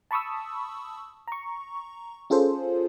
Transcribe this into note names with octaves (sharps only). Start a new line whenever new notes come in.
A5 B5 C#6 D#6 E6
A#5 C#6
C#4 F4 G#4 A4 C5